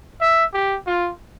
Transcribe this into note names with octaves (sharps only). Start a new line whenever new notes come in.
E5
G4
F4